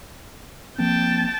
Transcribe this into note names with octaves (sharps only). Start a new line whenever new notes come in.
F3 A#3 C4 G5 A5